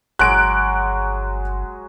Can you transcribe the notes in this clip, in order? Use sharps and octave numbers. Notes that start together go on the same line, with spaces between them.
G1 F#3 G#3 F#6 D7